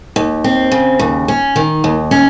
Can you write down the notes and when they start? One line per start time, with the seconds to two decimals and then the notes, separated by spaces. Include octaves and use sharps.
0.16 D#2
0.44 C4
0.72 C#3
0.99 D#2
1.28 C#4
1.56 D#3
1.84 D#2
2.11 C#4